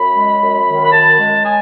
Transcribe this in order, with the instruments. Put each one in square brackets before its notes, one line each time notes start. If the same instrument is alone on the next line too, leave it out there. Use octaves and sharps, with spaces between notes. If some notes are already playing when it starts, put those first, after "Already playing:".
Already playing: [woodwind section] F#2 B5
G#3
F#2
D#3
B5
F#2 A5
G#3
G#5